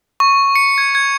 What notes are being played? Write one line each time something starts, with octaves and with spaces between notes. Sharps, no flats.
C#6
C#7
G#6
G#6